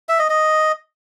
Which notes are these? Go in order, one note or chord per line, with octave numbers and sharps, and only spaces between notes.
E5
D#5
D#5